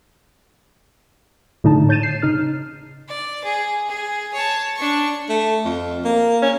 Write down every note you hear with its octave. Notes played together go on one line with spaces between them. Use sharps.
A2 D3 D#4 A5
C#5 G6 A6 D#7 E7
C7
C#3 D#4 F6
D5
G#4
G#4
C#5 A5
D4 C#6
A3
F2
A#3
C#4